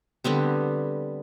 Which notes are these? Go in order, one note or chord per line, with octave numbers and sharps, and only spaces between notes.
D3 G3 B3 C4